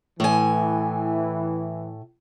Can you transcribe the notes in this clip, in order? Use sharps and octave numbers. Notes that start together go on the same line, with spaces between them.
A2 E3 G#5